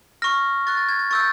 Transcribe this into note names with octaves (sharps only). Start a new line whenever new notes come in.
C#6 F6 A#6
C#6 F#6 A6
A6
G#6
G#6
C#6 E6 G6 A6